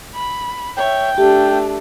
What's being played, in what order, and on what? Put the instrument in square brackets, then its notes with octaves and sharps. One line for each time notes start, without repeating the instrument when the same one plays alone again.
[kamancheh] B5
[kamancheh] C#5 E5 [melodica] G5
[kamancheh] A3 D4 [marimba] G4